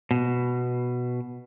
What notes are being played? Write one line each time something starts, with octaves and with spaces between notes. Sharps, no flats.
B2